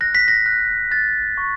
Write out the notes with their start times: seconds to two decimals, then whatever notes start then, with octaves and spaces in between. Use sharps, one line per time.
0.01 F#6 A#6
0.15 B6
0.28 A#6
0.46 F#6
0.91 F#6 A6
1.38 C#6